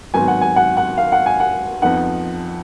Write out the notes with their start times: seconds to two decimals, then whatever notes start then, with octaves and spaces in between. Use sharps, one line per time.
0.14 G#1 G#2 F#3 B3 G#5
0.28 F#5
0.41 G#5
0.56 F#5
0.77 F#5
0.98 F5
1.12 F#5
1.26 G#5
1.40 F#5
1.82 F2 F3 B3 D#4 F#5